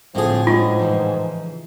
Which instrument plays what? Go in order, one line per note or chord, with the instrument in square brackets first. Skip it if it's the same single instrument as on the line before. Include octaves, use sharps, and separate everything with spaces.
[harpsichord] A2 G#4 [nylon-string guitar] D3 C4 F#4 [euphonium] F3
[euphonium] G#2 [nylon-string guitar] G#3 D4 E4 [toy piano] F4
[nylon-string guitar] C#3 E3 F3